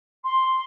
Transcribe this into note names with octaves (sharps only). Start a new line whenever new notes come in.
C6